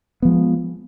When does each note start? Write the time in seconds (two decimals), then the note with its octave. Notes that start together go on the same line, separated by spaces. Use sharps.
0.22 B3
0.25 F3
0.28 G#3